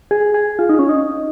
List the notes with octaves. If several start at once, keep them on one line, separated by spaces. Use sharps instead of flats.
G#4
G#4
F4
D#4
C#4
D#4